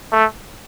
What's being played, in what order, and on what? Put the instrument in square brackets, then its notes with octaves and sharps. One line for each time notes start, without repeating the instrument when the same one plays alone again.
[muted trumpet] A3